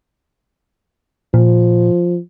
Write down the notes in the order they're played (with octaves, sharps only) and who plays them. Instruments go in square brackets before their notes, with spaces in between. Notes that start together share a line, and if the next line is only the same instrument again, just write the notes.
[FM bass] A#2 [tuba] F3